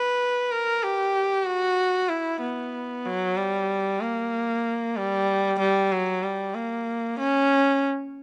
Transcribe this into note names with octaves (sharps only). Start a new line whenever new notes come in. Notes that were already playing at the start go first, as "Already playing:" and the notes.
Already playing: B4
A#4
G4
F#4
E4
B3
F#3
G3
A#3
G3
G3
F#3
G3
A#3
C#4